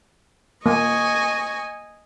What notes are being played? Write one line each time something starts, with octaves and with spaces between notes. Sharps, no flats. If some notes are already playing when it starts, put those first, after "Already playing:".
A#3 D#5 G#5 C#6